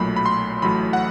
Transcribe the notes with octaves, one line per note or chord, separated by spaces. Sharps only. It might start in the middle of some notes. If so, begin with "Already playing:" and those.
Already playing: B1 A#2 F#3 A3 B5
B5
C6
A1 A2 F#3 A3 B5
F#5